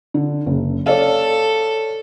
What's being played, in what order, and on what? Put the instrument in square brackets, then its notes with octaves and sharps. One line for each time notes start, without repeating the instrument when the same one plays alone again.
[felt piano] D3
F#1
[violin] A4 [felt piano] C#5 D5 F5